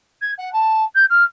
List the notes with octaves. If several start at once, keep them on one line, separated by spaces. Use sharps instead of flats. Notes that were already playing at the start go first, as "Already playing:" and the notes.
G#6
F#5
A5
G6
F6